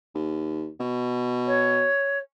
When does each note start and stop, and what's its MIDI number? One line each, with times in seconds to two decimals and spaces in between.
0.15 0.69 39
0.80 1.87 47
1.46 2.18 73